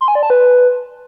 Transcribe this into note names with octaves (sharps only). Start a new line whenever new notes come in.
C6
G#5
D5
A5
B4